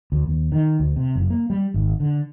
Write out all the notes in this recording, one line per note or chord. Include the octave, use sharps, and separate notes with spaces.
D2
D#2
D#3
D2
C3
F#1
A#3
G3
G#1
D3